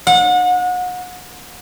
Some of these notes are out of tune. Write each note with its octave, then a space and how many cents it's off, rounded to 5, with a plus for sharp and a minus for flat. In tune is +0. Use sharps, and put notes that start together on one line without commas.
F#5 -35